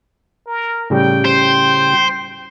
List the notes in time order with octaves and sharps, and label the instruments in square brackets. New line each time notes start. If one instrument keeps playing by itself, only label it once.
[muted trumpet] A#4
[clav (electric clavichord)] A2 C#3 G3 [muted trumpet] G5
[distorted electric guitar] C5